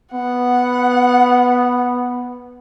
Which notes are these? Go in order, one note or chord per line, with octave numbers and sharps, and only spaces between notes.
B3 F#5